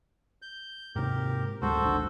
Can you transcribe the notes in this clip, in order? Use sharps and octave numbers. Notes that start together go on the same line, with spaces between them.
G6
G#2 C3 G4 A#4
D1 G#3 F#4 A4 C5
D1 G#1 D4